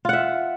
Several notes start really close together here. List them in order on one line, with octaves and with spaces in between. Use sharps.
F4 F#5 E5